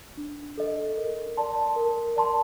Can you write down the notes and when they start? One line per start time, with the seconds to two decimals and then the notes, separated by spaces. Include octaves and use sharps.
0.17 D4
0.57 A4 D#5
0.97 A#4
1.37 D5 A5 C6
1.76 A#4
2.16 D5 A5 C6